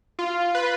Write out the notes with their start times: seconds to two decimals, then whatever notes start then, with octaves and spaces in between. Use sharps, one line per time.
0.19 F4
0.55 B4